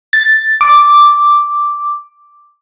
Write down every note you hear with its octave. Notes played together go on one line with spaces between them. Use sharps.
A6
D6